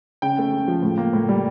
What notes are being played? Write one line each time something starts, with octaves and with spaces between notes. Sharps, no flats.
C#3 G5
A3
C#3
F3
A2
A#3
A2
G3